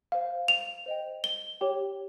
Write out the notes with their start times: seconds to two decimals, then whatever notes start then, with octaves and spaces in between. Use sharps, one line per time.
0.12 C5 F5
0.48 F7
0.86 C5 D#5 G5
1.24 G7
1.61 G4 C#5 G5